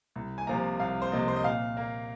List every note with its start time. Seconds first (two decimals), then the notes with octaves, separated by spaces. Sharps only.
0.16 C2
0.38 G#5
0.47 C3 F3 A#3 A#5
0.80 C2 F5
1.02 C5
1.12 C3 F3 A#3 D#5
1.28 C5
1.36 D#5
1.44 A#2 F5
1.77 A#3